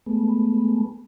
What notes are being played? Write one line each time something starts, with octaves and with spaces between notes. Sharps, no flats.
G#3 A3 B3